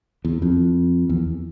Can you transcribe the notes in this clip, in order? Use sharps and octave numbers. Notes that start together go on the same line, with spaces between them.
E2
F2
E2